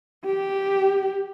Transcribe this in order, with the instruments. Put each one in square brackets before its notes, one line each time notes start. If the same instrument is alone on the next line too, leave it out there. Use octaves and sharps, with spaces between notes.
[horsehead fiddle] G4